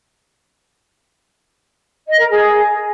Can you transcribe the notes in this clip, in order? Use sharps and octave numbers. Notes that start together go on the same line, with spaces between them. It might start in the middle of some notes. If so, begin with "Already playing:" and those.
D#5
A#4
G#4